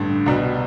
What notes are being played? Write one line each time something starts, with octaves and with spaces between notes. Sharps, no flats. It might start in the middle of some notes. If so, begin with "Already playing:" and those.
Already playing: A1 G2 D3
C2 B2 G3